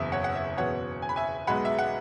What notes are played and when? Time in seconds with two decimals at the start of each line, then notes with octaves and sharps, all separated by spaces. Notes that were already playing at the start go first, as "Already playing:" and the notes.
Already playing: F#1 E2 B2 E5
0.12 C#5 F#5
0.24 F#5
0.35 E5
0.57 F#1 E2 B2 B3 C#5 F#5
1.02 G#5
1.09 B5
1.16 E5 G#5
1.47 B1 B2 G#3 F#5 B5
1.65 E5
1.79 F#5